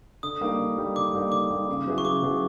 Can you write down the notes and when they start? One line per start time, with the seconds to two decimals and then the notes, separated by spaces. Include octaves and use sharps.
0.23 D3 D#6
0.41 G3 A#3 D#4
0.59 D3
0.78 G3 A#3 D#4
0.96 D3 D6
1.13 G3 A#3 D#4
1.31 D3 D6
1.50 G3 A#3 D#4
1.69 C#3
1.86 F#3 B3 E4 G#4
1.98 C#6
2.05 C#3 D6
2.23 F#3 B3 E4 G#4